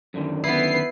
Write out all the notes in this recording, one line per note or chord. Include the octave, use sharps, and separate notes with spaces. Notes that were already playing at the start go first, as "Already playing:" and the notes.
F#2 D3 D#3
B3 E4 B4 C7